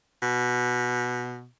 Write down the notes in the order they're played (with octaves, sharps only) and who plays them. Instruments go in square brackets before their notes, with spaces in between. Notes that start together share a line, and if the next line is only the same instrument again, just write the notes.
[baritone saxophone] B2